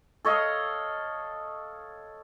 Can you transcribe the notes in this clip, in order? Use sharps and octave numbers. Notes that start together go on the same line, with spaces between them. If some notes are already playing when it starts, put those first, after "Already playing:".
A4 C#5 D#5 F5